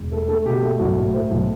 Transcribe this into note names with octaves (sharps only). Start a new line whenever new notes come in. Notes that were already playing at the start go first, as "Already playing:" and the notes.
Already playing: E1
A3 A4
A3 A4
B2 G4
A3
B1 F#4
A2
A2 C5
B1